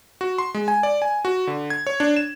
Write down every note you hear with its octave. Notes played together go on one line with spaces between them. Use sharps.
F#4
C6
G#3
G#5
D5
G#5
F#4
D3
G#6
C#5
D4
E7